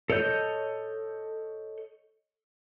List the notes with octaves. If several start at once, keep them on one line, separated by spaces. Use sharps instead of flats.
A4 C#5 D#5 G6